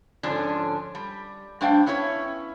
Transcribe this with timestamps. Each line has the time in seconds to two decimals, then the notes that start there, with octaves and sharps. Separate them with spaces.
0.23 G#2 D3 F3 C#4 D4
0.95 G3
1.61 G2 A3 D4 C5 F5 G5
1.86 B3 C#4 E4 B4 C#5